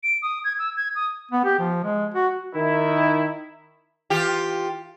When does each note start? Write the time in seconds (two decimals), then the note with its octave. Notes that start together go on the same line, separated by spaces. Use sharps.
0.04 D7
0.22 D#6
0.44 G#6
0.59 E6
0.77 G#6
0.95 D#6
1.31 B3
1.45 G4
1.59 F3
1.84 G#3
2.14 F#4
2.55 D#3 E4
4.10 E3 F4 G4